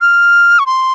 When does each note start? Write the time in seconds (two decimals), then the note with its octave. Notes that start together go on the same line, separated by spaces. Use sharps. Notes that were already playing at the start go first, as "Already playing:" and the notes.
0.01 F6
0.59 C#6
0.66 C6